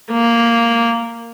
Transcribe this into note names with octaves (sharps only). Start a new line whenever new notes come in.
A#3